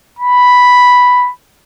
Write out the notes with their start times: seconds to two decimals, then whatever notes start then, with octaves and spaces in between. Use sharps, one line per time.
0.19 B5